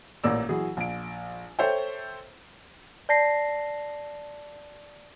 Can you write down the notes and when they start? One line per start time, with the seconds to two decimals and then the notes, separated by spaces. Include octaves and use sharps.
0.24 A1 A#2 A#3 D5 E6
0.49 E3 F#3 G#4
0.77 A#1 D7
1.59 A4 C5 C#5 E5 G5
3.09 D5 A5 A#6 C7